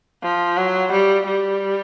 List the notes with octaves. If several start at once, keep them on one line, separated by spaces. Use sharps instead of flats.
F3
F#3
G3
G3